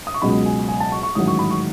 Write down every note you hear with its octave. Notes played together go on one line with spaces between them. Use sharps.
D#6
C#6
C#2 B2 F#3 B5
G#5
G#5
A5
C#6
C#6
A1 G#2 D#3 F#3 D#6
C#6
B5
C#6